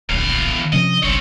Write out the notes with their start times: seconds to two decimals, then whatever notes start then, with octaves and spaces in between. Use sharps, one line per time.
0.09 D1 A#1 E2 F5
0.73 C3 F3 C#4 D#5
1.03 F#1 B1 C4 C#5